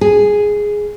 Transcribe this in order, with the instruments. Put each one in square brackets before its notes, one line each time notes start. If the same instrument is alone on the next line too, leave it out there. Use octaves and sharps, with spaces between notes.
[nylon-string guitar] G#4